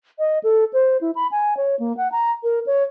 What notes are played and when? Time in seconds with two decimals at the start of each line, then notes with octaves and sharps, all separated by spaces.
0.19 D#5
0.43 A4
0.73 C5
1.01 E4
1.15 B5
1.31 G#5
1.57 C#5
1.79 A#3
1.97 F#5
2.12 A#5
2.43 A#4
2.66 C#5